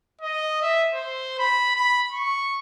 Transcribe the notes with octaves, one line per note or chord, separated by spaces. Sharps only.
D#5
E5
C5
B5
B5
C#6